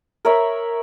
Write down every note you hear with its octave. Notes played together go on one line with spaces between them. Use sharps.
A#4 C#5 E5 B5